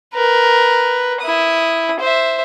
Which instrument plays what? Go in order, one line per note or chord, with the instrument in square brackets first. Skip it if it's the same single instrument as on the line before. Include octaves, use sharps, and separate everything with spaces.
[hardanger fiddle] A#4 B4
E4 D#6
C5 E5